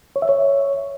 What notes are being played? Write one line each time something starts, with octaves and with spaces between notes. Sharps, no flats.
C#5
E5
C#5